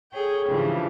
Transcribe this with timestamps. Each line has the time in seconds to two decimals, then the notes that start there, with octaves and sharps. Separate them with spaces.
0.13 G#4 A4 C#5 G5
0.48 G#2 C#3 E3 F3 G3 D4